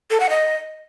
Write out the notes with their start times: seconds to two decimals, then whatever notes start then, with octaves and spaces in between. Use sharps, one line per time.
0.10 A4
0.20 F#5
0.30 D#5